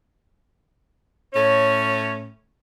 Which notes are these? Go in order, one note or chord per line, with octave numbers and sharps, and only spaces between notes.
A2 C#4 C#5